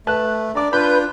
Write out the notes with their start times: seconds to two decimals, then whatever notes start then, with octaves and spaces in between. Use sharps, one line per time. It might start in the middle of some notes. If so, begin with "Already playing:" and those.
0.07 A3 B4 A5 F#6
0.55 D4 D5 A#5 D6
0.73 D4 F4 B4 B5 G6